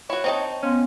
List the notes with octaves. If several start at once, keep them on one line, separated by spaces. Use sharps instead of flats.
E4 F#4 C#5
C4 D#4 A5
B3 C#4 F5 C6